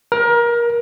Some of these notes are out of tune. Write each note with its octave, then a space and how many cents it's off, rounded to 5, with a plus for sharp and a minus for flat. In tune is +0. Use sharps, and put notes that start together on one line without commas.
A#4 +25